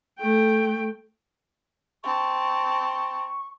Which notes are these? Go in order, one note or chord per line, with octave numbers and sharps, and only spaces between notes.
A3 G5
C4 A5 C#6